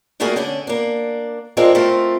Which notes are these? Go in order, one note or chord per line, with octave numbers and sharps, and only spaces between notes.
G3 A3 A#3 F#4 G#4 A#4
D3 C#4 D4
A#3 D4
F3 G#3 A#3 C4 D4
A3 C4 F4 A#4